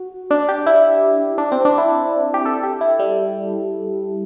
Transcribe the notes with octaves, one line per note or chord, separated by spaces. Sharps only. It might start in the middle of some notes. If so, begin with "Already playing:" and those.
Already playing: F#4
D4
G4
E4
D4
C4
D4
E4
G4
A4
G4
E4
G3